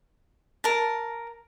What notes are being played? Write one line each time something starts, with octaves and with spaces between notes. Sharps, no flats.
A#4 A5